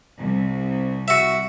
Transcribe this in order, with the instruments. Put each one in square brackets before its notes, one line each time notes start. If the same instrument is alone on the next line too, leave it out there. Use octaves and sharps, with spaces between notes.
[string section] C2
[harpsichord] F#4 E5